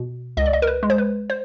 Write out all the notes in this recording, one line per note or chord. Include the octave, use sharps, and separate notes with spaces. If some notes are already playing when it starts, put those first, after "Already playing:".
Already playing: B2
C#2 D#5
D5
D#5
A#4
B4
G#3
C5
B4
C5